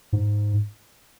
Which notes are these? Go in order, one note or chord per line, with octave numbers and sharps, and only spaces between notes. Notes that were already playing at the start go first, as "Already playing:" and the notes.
G#2